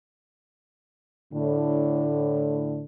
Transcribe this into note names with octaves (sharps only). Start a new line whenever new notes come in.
A2 D3